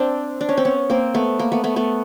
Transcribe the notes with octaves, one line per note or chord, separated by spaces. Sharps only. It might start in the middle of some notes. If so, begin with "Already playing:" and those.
Already playing: C4 D4
D4
C#4
C4
B3 C#4
A#3 C4
A3 B3
A#3
A3 B3
A3 B3
A3 B3